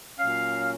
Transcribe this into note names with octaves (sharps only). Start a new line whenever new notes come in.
A#2 F#3 C#4 F5